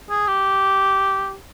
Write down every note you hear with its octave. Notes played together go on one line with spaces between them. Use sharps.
G#4
G4